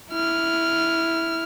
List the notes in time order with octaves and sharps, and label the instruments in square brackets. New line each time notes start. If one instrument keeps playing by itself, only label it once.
[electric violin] E4 F6